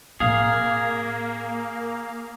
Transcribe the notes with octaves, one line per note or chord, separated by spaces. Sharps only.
A2 A#3 C4 G#4 F5